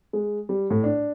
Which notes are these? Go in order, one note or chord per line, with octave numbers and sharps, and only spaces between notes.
G#3
G3
A2
D4